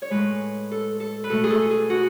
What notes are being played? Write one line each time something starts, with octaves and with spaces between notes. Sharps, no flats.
C#5
A2 G#3 B4
A4
A4
B4
B2 A3 A4
G#4
A4
G#4
F#4